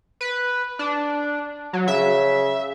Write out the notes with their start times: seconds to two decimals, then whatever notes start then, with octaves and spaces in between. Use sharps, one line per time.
0.21 B4
0.79 D4
1.73 F#3
1.88 C#3 E5